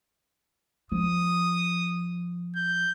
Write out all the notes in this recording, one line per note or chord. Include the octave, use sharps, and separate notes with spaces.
F3 D#6
G6